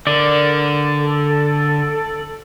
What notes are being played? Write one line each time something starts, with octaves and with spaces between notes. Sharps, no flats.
D3 A#4 D5
A4